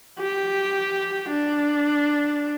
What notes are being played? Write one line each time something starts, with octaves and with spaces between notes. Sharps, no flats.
G4
D4